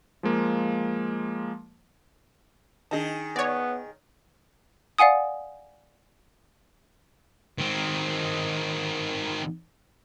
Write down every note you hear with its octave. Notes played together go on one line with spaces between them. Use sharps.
F3 G#3 A#3
D#3 D4 G#4 D#5 A5
B3 C#5 D5 A#6
D5 F5 F#5 G#5 D#6
D#3 C4